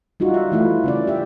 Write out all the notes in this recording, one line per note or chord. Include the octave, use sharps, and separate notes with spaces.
G3 D#4 F4 F#4
E5
E3 A3 E4 F4
C#3 C#4 D5
G4 E5